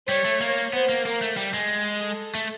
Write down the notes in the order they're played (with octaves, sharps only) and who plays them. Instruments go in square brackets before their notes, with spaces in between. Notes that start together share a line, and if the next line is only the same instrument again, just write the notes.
[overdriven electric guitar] G3 [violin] C#5
[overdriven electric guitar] A3
A#3
[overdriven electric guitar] B3 [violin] C5
[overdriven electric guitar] A#3
[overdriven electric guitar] A#3 [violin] A#4
[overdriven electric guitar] A3
G3
G#3
[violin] A4
[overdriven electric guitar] A3